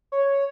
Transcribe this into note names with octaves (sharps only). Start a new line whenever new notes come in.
C#5